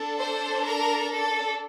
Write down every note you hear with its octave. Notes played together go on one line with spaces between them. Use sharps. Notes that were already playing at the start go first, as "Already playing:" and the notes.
Already playing: D4 A4
C5
A#4
A4